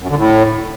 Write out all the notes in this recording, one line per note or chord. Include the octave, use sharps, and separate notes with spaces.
F#2
D3
A2